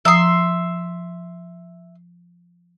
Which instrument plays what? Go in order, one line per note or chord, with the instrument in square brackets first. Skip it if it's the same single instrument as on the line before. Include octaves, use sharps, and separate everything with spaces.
[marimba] F3 A#5 D#6 [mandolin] E5 C6